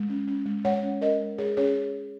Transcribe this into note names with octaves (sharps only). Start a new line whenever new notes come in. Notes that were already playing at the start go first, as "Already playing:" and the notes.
Already playing: G#3
C#4
C#4
G#3
G#3 C#5 F#5
C#4
C#4 A#4 D#5
G#3
G#3 G#4 C#5
C#4 G#4 C#5